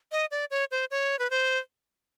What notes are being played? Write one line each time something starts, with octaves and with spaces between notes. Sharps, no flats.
D#5
D5
C#5
C5
C#5
B4
C5